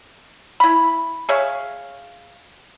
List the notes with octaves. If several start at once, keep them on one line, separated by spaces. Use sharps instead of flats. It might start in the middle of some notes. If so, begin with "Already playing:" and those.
E4 B5
G#4 C#5 E5 F5